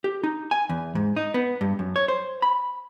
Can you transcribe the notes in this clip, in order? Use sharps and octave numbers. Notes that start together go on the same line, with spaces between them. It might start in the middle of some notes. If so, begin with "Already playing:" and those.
G4
D#4
G#5
E2
G#2
D#4
B3
G2
F#2
C#5
C5
B5